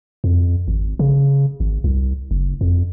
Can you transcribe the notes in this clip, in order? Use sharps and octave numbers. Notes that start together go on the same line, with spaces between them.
F2
G#1
C#3
G#1
C2
F#1
F2